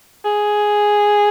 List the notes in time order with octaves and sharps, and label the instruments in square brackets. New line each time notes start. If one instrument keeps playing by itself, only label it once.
[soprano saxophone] G#4